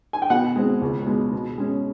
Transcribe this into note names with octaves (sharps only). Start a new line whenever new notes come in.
G#5
G5
B2 F#5
G#3 C4
C#2
B2 G#3
B2
G#3 C#4